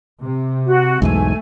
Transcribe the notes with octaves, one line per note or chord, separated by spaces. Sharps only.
C3
F#4
B1 E2 G#2 A3 G#5